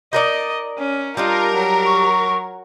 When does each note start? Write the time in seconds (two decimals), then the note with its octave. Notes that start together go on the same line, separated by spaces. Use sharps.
0.13 D#4 A#4 D5 D#5
0.79 C#4
1.17 G3 D4 D#4 F4 A#4
1.55 F#3
1.85 C#6